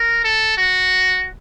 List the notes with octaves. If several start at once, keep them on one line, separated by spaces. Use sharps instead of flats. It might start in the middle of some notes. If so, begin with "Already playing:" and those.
Already playing: A#4
A4
F#4